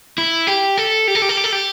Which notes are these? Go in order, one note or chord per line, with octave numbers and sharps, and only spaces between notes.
E4
G4
A4
G4
A4
G4
A4
G4
A4
G4